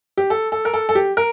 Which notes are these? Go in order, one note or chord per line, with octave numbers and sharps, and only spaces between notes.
G4
A4
A4
A#4
A4
A4
G4
A#4